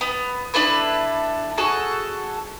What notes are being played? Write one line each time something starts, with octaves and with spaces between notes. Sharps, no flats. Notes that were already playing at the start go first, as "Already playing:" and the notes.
B3
D4 E4 A4 B4
F#4 G#4 A4